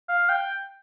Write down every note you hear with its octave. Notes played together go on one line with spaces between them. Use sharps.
F5
G5